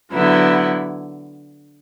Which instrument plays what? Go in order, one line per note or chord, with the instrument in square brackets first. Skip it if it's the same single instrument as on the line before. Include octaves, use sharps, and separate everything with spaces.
[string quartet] D3 F#3 B3 E4